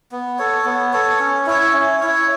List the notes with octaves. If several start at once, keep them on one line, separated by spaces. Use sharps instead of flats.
B3
A4 C#5
B3
A4 C#5
C#4
E4 C#5
C#4
E4 C#5